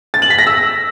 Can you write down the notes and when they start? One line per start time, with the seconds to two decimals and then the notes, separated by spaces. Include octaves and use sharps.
0.14 A6
0.22 F#7
0.30 B6
0.39 A#6
0.47 E6